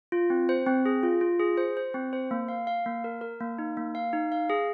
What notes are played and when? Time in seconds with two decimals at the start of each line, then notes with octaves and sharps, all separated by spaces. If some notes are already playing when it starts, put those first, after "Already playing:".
0.12 F4
0.30 C4
0.49 C5
0.66 C4
0.85 G#4
1.03 F4
1.21 F4
1.40 G#4
1.57 C5
1.77 C5
1.94 C4
2.13 C5
2.31 A#3
2.48 F5
2.67 F5
2.86 A#3
3.04 A#4
3.21 A#4
3.40 A#3
3.58 D#4
3.77 A#3
3.95 F5
4.13 D#4
4.32 F5
4.49 G#4